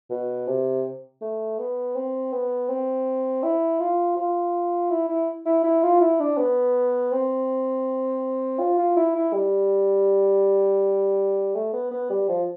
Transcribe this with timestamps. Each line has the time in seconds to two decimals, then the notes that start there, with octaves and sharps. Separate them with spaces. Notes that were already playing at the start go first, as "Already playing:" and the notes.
0.10 B2
0.47 C3
1.21 A3
1.59 B3
1.95 C4
2.32 B3
2.69 C4
3.43 E4
3.80 F4
4.16 F4
4.90 E4
5.09 E4
5.46 E4
5.64 E4
5.83 F4
6.01 E4
6.20 D4
6.37 B3
7.12 C4
8.59 F4
8.78 F4
8.97 E4
9.15 E4
9.33 G3
11.55 A3
11.73 B3
11.91 B3
12.10 G3
12.29 F3